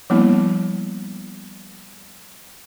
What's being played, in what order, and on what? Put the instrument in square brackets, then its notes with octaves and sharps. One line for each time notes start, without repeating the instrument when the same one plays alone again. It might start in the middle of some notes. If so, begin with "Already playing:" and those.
[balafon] F3 G3 A#3 B3 D4 E4